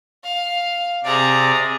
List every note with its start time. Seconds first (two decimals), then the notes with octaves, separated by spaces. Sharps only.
0.23 F5
1.04 C3 G#4 D5 A#5